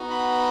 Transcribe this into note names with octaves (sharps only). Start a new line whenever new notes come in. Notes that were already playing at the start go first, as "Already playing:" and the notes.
Already playing: B3 D#4 F#4
B5